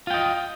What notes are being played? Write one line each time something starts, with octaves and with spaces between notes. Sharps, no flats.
F4 D#5 G5